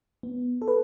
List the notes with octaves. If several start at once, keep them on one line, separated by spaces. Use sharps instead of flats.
B3
A4
B4